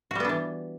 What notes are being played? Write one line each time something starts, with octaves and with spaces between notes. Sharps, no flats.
E3 G3 B3 D4 F#4